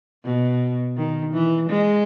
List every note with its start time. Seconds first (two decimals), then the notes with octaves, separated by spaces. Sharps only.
0.25 B2
0.97 D#3
1.33 E3
1.69 G#3